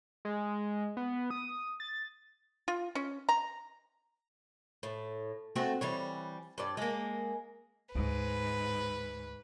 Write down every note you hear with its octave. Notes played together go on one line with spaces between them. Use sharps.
G#3
B3
D#6
A6
F4
C#4
A#5
A2
A3 C4 F#4
E3 G3 C#5
G2 D5
G#3 A#3
D2 G#2 B4